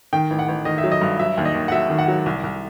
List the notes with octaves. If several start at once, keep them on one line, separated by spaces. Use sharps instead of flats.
D#3 G5
A1
F#5
A1
D#3 D#5
E5
F#3
D#5
G2
F#3 E5
D#2
D#5
D#2
F#5
F#3 E5
D#3
F#5
F#3
C2
C2